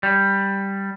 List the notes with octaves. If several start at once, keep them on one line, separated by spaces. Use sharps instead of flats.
G3